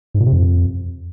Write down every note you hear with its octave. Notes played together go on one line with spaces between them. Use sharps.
G#2
A#2
C3
F2